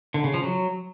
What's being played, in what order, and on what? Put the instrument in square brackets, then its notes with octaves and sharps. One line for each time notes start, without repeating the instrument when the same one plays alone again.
[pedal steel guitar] D3
C#3
F3
F#3